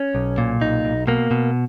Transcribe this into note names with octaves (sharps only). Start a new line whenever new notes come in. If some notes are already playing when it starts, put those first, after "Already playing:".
Already playing: C#4
B1
A#2
B1 D#4
B1
B2 A#3
B2